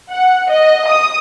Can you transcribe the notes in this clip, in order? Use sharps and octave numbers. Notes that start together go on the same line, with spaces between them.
F#5
D#5
D#6